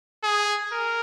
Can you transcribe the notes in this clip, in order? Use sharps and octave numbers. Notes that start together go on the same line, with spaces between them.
G#4
A#4